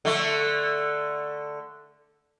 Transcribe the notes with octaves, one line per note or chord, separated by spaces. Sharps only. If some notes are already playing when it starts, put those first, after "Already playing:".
D3 A3